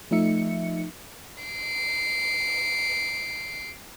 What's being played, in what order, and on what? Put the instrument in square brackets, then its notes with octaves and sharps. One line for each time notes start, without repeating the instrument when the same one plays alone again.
[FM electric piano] F3 A3 D#4 E5 C#7
[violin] C7 D7